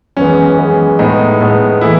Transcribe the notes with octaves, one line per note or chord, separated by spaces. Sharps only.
F#2 E3 G#3 B3 C#4
F#2 E3 G#3 B3
A2 G#3 B3 D#4
A2 G#3 B3
E3 A3 E4